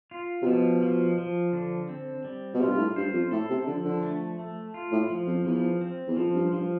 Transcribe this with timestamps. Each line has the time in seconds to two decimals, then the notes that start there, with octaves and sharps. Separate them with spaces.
0.11 F4
0.42 C3
0.46 B2 F3
0.82 F3
1.18 F3
1.53 D3
1.89 C4
2.25 G3
2.54 B2
2.60 C3 F4
2.69 G2
2.79 A2
2.96 G2 C5
3.13 F2
3.31 A2 A4
3.50 C3
3.67 D3 F3
3.85 D3
4.03 A3
4.39 A3
4.74 F4
4.92 A2
5.10 F3
5.27 F2
5.45 E2 F3
5.81 C4
6.08 E2
6.17 F2 F3
6.35 G2
6.52 G2 F3